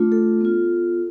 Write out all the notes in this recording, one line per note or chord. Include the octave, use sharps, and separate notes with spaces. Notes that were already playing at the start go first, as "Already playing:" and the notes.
Already playing: A3 D4 F4
A4
B3 F4